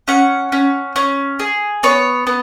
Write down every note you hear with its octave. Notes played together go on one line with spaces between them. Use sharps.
C#4 F#5
C#4
C#4
G#4
B3 C#5
B3